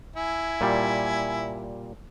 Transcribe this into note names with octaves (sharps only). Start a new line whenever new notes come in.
E4 G#5
A#2 G3